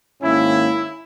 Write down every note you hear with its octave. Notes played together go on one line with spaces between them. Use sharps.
G#2 D#3 A#3 C#4 E4